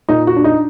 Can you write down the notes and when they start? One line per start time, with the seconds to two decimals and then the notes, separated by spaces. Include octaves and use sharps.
0.09 A#2 D#4
0.27 F#4
0.36 D4
0.44 D#4